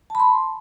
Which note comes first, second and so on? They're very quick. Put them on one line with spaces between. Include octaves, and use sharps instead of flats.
A5 B5 C6